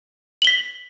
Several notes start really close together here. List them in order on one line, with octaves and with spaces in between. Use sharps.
F#7 G7 B6